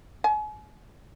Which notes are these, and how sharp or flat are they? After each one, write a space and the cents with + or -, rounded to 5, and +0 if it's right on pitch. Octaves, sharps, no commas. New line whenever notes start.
G#5 +40